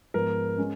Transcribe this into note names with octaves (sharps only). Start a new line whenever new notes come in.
G#2 F3 B3 A#4
G#3 C#4